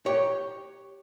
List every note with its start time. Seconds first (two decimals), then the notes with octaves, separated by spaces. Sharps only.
0.06 G4 C#5